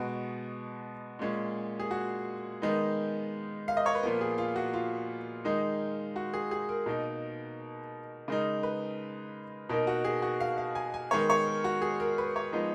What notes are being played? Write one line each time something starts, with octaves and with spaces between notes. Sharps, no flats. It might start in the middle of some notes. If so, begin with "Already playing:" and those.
Already playing: B2 G#3 B3 F#4
A#2 G#3 C#4
G#4
F#4
D#3 G#3 B3 D#4
F5
D#5
C#5
B4
A#2 F3 B3 A#4
G#4
F4
F#4
F4
D#3 G#3 D#4
F#4
G#4
G#4
A#4
B2 A#3 D#4
C#3 G#3 D#4 A#4
B4
B2 A#3 D#4 A#4
F#4
G#4
F#4
F5
F5
G#5
G#5
D#3 G#3 B3 C#5
C#5
A#4
F#4
G#4
A#4
B4
C#5
F3 G#3 B3 D#4